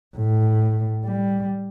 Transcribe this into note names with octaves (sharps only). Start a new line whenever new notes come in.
A2
G3